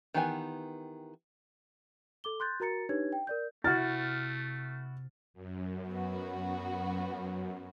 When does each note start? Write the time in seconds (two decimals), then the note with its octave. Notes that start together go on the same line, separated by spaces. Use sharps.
0.14 D#3 E3 B3 G4 G#5
2.24 A4 D6 G7
2.40 C6 F#6 G6 A6
2.60 F#4 A#4 A#5 A6 C#7
2.89 D4 D#4 G4 B4 C#5 G#6
3.13 G5
3.27 A#4 D5 G6
3.64 C3 A3 E4 F#4 F6 A6
5.34 F#2
5.89 B3 F#4